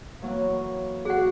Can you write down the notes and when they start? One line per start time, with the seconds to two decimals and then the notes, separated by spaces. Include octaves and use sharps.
0.22 E3 F#3 A#3
1.05 F#4 G#4 F#5 F#6